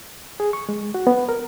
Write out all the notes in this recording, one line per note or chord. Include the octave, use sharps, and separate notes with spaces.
G#4
C#6
G#3
F#4
B3
A#4